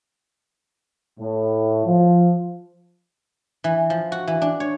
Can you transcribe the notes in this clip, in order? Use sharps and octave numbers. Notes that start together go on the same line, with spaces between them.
A2
F3
E3
F3
F#4
E3
D4
C#5